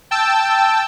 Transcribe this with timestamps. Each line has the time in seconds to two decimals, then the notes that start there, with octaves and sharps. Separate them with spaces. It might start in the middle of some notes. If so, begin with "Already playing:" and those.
0.11 G5 A5 E6